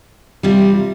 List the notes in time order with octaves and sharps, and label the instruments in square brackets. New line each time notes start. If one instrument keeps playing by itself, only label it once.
[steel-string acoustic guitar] C3 E3 G3 C4 F4